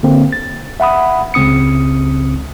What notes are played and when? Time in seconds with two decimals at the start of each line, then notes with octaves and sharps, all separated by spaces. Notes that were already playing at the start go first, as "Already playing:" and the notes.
0.03 D3 A#3 C4
0.32 A6
0.80 E5 F#5 B5 D#6
1.34 C#2 C#3 C4 D#6 C#7